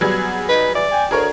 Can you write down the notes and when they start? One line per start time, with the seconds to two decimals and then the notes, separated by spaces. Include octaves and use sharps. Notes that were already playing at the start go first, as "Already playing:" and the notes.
0.01 F#3 G3 B3 G#4
0.49 D#4 B4
0.75 E3 D5
0.92 G5 G#5
1.11 D2 G#4 A#4 C#5